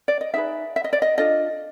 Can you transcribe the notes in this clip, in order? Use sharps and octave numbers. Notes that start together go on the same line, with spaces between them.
D5
D#5
D#4 G#4 B4 E5
E5
D#5
D5
D#5
D4 F4 A4 D#5